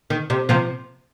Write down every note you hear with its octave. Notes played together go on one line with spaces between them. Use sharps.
D#3
C3
C3 F3